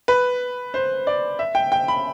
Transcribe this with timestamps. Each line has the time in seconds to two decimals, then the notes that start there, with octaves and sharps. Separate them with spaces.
0.08 B4
0.74 C5
1.07 D5
1.39 E5
1.55 G5
1.72 G5
1.88 B5